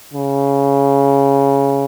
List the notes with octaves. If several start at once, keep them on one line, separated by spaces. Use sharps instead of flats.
C#3